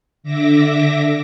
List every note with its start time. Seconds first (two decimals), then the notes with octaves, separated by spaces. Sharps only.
0.23 D3 E5 D6 A#6